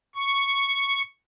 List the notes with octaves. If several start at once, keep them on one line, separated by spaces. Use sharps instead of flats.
C#6